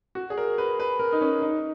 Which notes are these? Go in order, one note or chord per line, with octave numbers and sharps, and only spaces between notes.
F#4
G#4
A#4
B4
B4
A#4
D#4
C#4
D#4